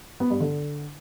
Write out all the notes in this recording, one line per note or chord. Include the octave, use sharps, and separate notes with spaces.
B3
G2
D3